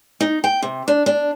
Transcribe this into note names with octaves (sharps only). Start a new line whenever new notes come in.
D#4
G5
C3
D4
D4